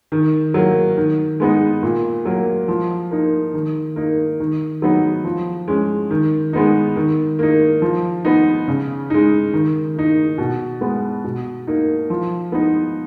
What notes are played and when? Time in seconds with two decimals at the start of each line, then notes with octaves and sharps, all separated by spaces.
0.12 D#3
0.54 F#3 A#3
0.97 D#3
1.40 G#3 B3 D#4
1.83 A#2
2.25 F#3 A#3
2.68 F3
3.11 A#3 D#4
3.54 D#3
3.96 A#3 D#4
4.40 D#3
4.82 F#3 B3 D#4
5.25 F3
5.68 G#3 C#4
6.11 D#3
6.53 G#3 B3 D#4
6.96 D#3
7.39 A#3 D#4
7.82 F3
8.25 B3 D#4
8.68 C#3
9.10 G#3 D#4
9.53 D#3
9.96 A#3 D#4
10.38 B2
10.81 G#3 B3
11.24 B2
11.67 A#3 D#4
12.10 F3
12.52 B3 D#4